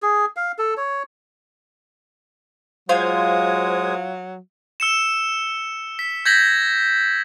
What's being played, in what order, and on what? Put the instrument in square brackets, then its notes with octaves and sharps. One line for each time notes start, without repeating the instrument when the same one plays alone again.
[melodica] G#4
F5
A4
C#5
[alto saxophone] F#3 [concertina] G#3 D#6 [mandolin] F4 [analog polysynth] C5 G#6
[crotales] E6 C#7 E7
B6
G6 G#6 A#6 B6 F#7